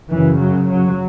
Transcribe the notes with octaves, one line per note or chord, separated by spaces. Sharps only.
F#2 C#3 E3
F#3
F#3